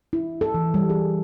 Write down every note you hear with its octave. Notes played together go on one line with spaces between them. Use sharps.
E4
A4
E3
G3
G#4